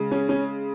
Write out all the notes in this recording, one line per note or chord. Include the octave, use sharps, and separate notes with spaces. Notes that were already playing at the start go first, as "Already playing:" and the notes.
Already playing: C#3 G#3
C#4
C#4